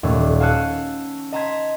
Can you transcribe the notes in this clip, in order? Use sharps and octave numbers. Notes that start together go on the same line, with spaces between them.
D#2 A#2 A3 C#4
D#1
F5 G#5 A5 E6 F#6 C#7
D#5 A5 A#5 C6 G#6 B6